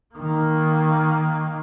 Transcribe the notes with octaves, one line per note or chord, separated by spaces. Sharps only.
D#3 A#3